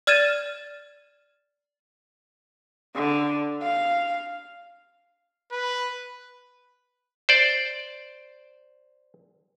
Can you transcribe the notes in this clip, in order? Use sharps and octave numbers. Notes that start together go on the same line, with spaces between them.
D5 F6 G#6 A6 D#7 E7
D3
F5
B4
C5 D5